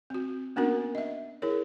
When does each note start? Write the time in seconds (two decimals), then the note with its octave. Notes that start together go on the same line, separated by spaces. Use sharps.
0.10 C4 F#4
0.56 A#3 B3 C#4 D4 F#4 A#4
0.95 D#5 E5
1.42 E4 G#4 A#4 C#5